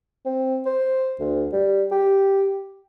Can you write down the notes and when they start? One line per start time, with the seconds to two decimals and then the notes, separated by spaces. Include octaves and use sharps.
0.25 C4
0.66 C5
1.20 D2
1.53 G3
1.92 G4